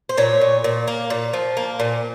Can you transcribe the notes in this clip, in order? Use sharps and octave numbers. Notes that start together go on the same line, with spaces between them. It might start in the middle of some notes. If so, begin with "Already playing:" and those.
C5
A#2 C#5
A#2
A#2
A#3
A#2
F3
A#3
A#2